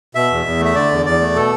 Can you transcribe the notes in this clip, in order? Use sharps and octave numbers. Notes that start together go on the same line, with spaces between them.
B2 E5
E2
E2
A3 E5
D3 D5
E2
E2 D5
A3
B2 A4